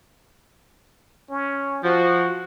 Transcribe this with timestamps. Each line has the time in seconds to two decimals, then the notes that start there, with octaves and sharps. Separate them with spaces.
1.30 C#4
1.83 F3 F#4